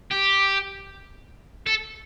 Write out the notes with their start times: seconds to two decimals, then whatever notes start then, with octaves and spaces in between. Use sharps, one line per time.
0.12 G4
1.66 A4